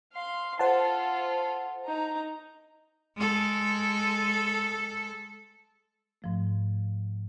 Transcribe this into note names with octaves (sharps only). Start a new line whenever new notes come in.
F5 C6
F4 A4 C5 F#5 A5
D#4 A#5
G#3 A4
G#2 F3 A3